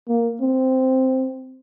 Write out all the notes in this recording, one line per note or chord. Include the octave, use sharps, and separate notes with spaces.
A#3
C4